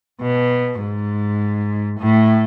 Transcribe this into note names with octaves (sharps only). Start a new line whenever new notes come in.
B2
G#2
A2